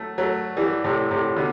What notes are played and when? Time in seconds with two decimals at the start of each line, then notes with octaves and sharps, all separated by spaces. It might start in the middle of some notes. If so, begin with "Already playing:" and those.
Already playing: F#3 A3
0.18 F#3 A3
0.57 E3 G3
0.84 A2 C3
1.11 A2 C3
1.36 B2 D3